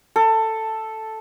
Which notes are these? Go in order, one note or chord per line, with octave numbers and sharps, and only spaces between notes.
A4